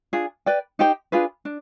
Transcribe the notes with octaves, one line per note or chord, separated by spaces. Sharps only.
D4 F4 G#4
B4 D5 G5
D#4 G4 C5 G5
D4 F4 G#4 B4
D4